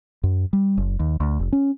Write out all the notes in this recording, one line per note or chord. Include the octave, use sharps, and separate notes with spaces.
F#2
G3
F#1
D#2
D2
F1
C#4